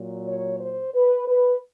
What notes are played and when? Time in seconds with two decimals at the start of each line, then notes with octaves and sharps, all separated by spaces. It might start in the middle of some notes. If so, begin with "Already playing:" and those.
Already playing: A#2 F#3
0.26 C#5
0.60 C5
0.93 B4
1.26 B4